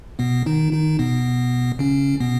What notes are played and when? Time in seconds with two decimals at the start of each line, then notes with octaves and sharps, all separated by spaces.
0.19 B2 B3
0.46 D#3 D#4
0.73 D#3 D#4
0.99 B2 B3
1.79 C#3 C#4
2.20 B2 B3